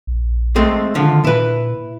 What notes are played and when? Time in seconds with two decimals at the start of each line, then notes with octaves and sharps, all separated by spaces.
0.07 A#1
0.56 G#3 A3 C4
0.95 D3 D#3 F3
1.24 A#2 E4 B4